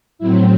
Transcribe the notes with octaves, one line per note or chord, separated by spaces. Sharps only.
A2 F#3 C4 E4